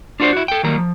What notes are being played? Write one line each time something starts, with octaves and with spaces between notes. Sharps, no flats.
D4 F4 F#4 A#4 C5 D5
E4 F#4
A4 G5
D#3 F#3 G3 A#3 A#5
F3